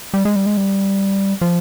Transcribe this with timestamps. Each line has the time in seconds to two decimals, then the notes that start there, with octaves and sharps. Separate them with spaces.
0.14 G3
0.25 G#3
0.36 G3
0.46 G#3
0.57 G3
1.41 F3